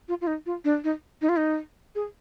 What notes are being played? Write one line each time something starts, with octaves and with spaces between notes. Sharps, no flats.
F4
F4
D#4
F4
D4
D#4
D#4
F4
D#4
G#4